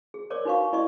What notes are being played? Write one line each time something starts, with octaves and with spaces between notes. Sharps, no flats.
G#4
A#4 C#5 D5 D6
D#4 F#4 B4 F5 C#6
E4 D5 D#5 C#6